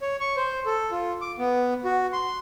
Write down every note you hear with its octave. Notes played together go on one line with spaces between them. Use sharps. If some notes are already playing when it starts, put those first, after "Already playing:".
C#5
C#6
C5
A4
F4
D6
B3
F#4
C6